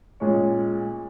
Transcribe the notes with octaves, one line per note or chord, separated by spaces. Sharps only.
A#2 G#3 C#4